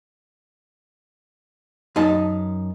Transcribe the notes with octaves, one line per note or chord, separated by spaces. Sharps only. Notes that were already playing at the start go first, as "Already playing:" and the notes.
F#2 D#4 A5